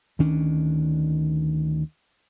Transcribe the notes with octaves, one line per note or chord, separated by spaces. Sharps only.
D2 D#3 C#4 D4